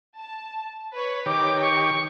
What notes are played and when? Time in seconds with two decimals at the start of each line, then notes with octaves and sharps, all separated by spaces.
0.18 A5
0.94 B4 C#5
1.26 D#3 G4 C#5 D6
1.62 C#6